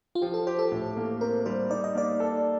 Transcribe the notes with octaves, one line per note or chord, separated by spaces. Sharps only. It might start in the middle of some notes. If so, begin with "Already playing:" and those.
F4
F3 G4
A4
G4 C5
A4
A2
A#3
C4 A#4
G3 C5
D#4 D5
D#5
A#3 D5
A4